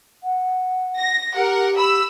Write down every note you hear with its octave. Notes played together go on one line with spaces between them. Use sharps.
F#5
A#6
G4 A#4 F#5
B5 E6